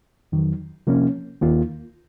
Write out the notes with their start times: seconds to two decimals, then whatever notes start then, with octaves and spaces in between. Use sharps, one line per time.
0.32 F2 D#3 F#3
0.87 C3 F3 A#3 C#4
1.42 D#2 D#3 A#3 F4